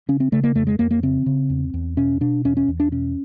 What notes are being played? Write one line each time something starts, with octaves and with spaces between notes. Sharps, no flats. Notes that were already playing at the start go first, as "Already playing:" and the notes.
C#3 C#4
C4
C#3 A3
A#3
F2 A3
G#3
F2 A#3
A#3
C#3 C4
C#3
E2
E2
B2 C#4
B2 D4
E2 C#4
C#4
E2
D4
B2 C#4